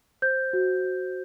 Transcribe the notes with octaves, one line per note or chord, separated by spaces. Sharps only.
C5 G6
F#4
F#4